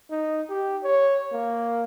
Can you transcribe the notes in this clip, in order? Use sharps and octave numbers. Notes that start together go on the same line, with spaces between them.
D#4
G4
C#5
A#3